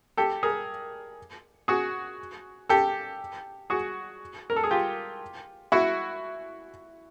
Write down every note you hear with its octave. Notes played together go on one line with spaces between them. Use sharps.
G4 A4
G#4 A#4
F#4 G#4
G4 A4
F#4 G#4
A#4
A4
G#4
F4 G4
E4 F#4